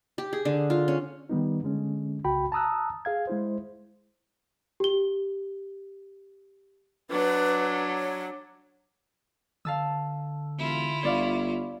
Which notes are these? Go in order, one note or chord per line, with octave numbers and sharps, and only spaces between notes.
G4
G#4
D3
F4
C#4
D#3 G3 B3 D#4
D3 G#3 C#4
C2 C#3 F#4 G5 B5
A5 A#5 D#6 E6 F#6
G#4 F5 G#6
G#3 E4 C5
G4 G7
F#3 D4 B4
C#5
D3 F5 A5 E6
E1 E4 F4
G1 C#5 D5 F5